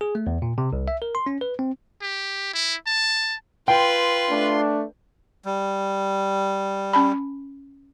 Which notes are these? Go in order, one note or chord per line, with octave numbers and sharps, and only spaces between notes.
G#4
A3
E2
A#2
C3
C2
E5
A#4
C6
C#4
B4
C4
G4
E4
A5
F4 B4 G5 C6
A3 D4
G3
C#4 A5 B5